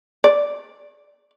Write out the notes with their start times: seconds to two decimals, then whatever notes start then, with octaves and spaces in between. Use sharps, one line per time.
0.24 D5